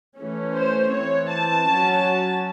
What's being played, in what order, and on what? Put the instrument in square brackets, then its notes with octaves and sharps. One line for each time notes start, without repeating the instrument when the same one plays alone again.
[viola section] E3 A3 C#4
C5
E3 C4 C#5
A5
F#3 C#4